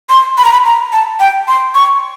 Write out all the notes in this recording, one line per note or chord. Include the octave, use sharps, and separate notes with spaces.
C6
B5
A#5
B5
A#5
A5
G5
C6
C#6